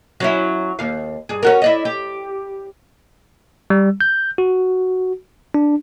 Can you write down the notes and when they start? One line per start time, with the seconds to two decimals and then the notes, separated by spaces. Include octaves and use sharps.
0.20 F#3 C#4 E4
0.79 D#2 F5
1.29 G2 G#4
1.43 C#4 F#4 A#4
1.62 E4 D5 D#5
1.85 G4
3.70 G3
4.01 G6
4.38 F#4
5.54 D4